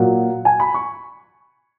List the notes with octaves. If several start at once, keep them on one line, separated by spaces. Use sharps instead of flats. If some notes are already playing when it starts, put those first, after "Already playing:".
Already playing: A#2 F#3 A#3 F#5
G#5
B5
C#6